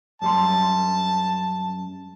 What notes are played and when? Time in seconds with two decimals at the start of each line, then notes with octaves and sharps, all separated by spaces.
0.22 F#2 G3 A5 C6